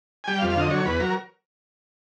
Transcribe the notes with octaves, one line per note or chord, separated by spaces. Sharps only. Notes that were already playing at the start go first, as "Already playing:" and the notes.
G#5
G3 G5
F5
F2
F5
D3 D#5
F#3 C#5
E2 B4
F#3 A#4